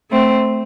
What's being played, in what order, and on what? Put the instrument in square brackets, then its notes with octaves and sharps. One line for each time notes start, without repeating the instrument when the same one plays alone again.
[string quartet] A3 C4